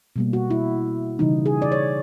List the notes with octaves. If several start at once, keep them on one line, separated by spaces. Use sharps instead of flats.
B2 G3 A#3
F#4
E4
C#3 E3 G3 D#4
G#4
D5
C#5